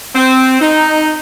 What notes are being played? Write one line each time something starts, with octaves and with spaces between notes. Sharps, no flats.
C4
D#4